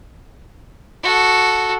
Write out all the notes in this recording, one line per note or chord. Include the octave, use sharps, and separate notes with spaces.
F#4 A4